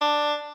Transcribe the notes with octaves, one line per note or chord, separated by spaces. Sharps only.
D4